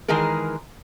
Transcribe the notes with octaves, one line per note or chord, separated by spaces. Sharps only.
D#3 E3 G#3 G#4 A#4